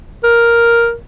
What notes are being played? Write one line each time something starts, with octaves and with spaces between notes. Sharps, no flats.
A#4